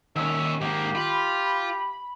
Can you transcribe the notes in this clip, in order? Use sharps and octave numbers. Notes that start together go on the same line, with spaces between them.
D#2 D#3 C#4 E5
G#2 A#3 G4
F4 B5